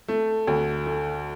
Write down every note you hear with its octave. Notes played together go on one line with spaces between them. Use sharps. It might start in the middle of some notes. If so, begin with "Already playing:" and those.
A3
D2
A3